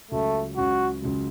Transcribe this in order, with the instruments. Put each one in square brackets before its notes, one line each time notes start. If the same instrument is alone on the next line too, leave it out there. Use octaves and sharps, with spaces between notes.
[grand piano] C#2 C#3 F#3 [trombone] A3
[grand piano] C#2 C#3 F#3 [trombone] F#4
[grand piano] C#2 C#3 F#3